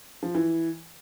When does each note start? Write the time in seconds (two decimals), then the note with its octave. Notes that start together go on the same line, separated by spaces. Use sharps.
0.23 F3
0.35 E3